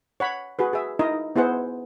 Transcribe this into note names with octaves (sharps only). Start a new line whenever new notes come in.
C#5 F#5 B5
F#4 G#4 B4
G#4 E5
D#4 E4 A#4 D#5
B3 E4 G#4 C5 F#5